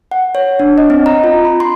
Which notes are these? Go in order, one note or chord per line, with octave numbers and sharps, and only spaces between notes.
F#5
C#5
D4
D#5
C4
A#5
F4
B5
C6